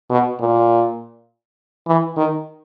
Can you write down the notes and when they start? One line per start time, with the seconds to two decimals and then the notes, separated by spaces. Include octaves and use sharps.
0.10 B2
0.39 A#2
1.87 E3
2.17 D#3